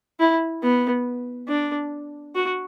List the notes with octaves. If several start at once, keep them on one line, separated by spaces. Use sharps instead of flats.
E4
B3
D4
F#4